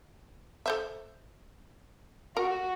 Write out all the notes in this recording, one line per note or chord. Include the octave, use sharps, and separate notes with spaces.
A4 C5 E5
F#4 A#4